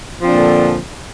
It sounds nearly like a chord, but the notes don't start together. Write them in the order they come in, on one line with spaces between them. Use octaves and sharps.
F3 C4 D4 A#2 D3